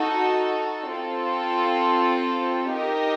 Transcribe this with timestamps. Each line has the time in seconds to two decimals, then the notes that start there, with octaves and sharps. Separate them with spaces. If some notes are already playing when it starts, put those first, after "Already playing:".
Already playing: D#4 F#4 A4
0.92 C4 F4 A4
2.74 D#4 G4 A#4 D#5